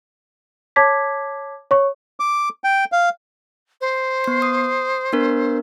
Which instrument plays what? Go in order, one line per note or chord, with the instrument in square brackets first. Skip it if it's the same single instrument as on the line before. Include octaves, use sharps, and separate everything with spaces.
[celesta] C#5 A5 D6 G#6 B6
C#5 C#6
[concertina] D6
G5
F5
[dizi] C5
[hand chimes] B3 C7
D#6
B3 D4 A#4